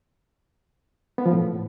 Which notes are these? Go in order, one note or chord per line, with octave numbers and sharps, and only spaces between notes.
B3
F3
A2